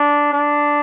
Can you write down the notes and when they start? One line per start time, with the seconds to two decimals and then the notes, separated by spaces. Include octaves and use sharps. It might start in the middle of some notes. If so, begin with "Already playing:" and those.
Already playing: D4
0.33 D4